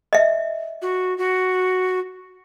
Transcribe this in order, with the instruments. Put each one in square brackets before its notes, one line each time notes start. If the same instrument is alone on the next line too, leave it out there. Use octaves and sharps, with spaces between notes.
[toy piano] D#5 E5
[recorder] F#4
F#4